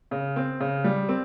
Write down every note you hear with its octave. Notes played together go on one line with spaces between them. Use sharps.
C#3
C4
C#3
G3
C4